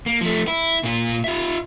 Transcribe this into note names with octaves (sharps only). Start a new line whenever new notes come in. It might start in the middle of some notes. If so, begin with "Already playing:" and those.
A#3
F3 A3
E4
A#2 F4
F4 E5